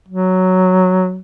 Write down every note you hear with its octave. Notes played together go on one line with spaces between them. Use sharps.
F#3